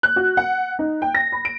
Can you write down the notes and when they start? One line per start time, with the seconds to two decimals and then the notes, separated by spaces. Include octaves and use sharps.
0.03 F#6
0.16 F#4
0.37 F#5
0.79 D#4
1.02 G5
1.15 A#6
1.32 B5
1.45 D7